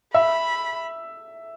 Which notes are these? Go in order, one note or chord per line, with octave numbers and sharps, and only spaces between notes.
E5 B5